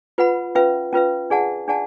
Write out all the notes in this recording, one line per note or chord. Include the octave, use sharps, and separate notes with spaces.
F4 B4 F#5 B5
C#4 F4 B4 F5
C#4 F4 B4 F5
D4 G#4 D5 F#5 A5
D4 G#4 D5 F#5 A5